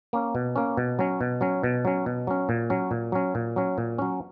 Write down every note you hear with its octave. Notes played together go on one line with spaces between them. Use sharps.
A#3 C#4
B2
A#3 C#4
B2
F#3 C#4
B2
F#3 C#4
B2
F#3 C#4
B2
F#3 C#4
A#2
F#3 C#4
A#2
F#3 C#4
A#2
F#3 C#4
A#2
F#3 C#4